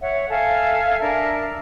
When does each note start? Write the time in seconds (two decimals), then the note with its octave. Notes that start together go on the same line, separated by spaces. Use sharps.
0.01 C#5 E5 F#5
0.29 A4 E5 F5 G#5
1.00 D4 A#4 E5 A5